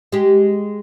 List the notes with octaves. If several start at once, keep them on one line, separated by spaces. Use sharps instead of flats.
G#3 G4